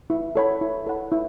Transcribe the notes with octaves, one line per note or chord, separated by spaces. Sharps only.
E4
A4 C#5 F#5 B5
E4
A4 C#5 F#5 B5
E4